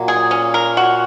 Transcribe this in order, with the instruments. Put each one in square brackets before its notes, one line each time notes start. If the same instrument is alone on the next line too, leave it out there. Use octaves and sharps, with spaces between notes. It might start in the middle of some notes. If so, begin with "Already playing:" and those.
Already playing: [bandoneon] A#2 A#3 [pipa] F#3
[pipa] G#4
C#4
A#4
F#4